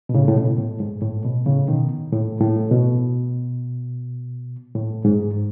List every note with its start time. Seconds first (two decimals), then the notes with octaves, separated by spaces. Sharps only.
0.09 B2
0.14 A2 C#3
0.28 A2
0.36 B2
0.58 A2
0.80 G#2
1.02 A2
1.24 B2
1.46 A2 C#3
1.68 B2 D#3
2.12 A2
2.41 A2
2.71 B2
4.75 A2
5.05 G#2